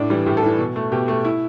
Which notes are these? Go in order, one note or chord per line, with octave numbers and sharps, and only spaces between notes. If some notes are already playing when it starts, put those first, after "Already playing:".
Already playing: A2 D4
E3 G3
A2 G4
A4
E3 G3
B2
A3
B2 G4
A3
E4